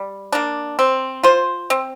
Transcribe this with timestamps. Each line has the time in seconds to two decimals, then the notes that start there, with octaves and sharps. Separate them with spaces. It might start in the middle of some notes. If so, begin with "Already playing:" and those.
Already playing: G3
0.32 A#3 D4
0.79 C4
1.23 F4 C5
1.70 C4